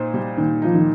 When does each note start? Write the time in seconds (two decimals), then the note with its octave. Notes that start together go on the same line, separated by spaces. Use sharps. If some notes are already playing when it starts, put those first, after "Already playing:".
Already playing: A#2 D#4 C5
0.14 G3
0.37 A#2 D#3
0.62 F3 D#4
0.74 D#3